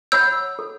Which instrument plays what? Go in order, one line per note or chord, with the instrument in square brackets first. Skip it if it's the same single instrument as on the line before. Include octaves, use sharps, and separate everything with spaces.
[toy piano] C#5 F#5 B5 [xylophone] E6 G6
[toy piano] A4